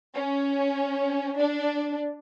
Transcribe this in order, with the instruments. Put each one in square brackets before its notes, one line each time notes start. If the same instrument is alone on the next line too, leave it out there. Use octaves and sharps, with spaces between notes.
[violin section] C#4
D4